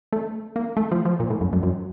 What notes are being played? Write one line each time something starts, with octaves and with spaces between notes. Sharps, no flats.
A3
A#3
A3
F3
F3
A#2
A2
F#2
F#2
F#2